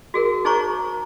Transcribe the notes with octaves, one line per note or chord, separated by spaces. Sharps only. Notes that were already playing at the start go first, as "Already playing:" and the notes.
F#4 G#4 A#4
D#4 G#4 C5 C#5 A#5 C#6